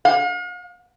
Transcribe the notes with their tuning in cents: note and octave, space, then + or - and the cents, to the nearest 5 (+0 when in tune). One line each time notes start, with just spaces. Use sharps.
F5 +45